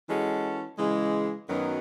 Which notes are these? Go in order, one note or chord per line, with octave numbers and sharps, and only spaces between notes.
E3 G#3 C#4 F#4 A4
C#3 E3 G#3
F#2 D#3 F#3 B3 D#4